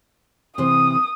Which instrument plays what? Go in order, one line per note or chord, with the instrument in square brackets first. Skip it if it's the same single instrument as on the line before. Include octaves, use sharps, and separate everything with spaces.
[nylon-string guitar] C3 E3 C5 [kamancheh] D#6